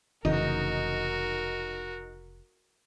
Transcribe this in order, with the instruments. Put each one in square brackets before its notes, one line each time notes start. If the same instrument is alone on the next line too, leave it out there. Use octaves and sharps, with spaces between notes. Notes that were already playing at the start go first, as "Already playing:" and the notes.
[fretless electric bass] F1 C#3 E3 [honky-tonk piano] D#4 [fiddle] F#4 A#4